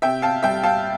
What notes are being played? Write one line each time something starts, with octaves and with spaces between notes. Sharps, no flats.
C3 E5 G5
F5 A5
G3 E5 G5
F5 A5